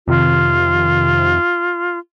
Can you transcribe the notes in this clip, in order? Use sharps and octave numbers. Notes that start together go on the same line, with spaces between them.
F2 C3 D#3 F4